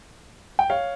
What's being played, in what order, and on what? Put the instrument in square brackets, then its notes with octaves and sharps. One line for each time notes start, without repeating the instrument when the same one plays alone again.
[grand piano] G5
C#5 F5